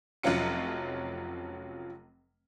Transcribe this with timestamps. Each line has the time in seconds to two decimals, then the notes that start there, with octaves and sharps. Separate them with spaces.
0.23 F1 F3 F#3 C#4 F4 C#7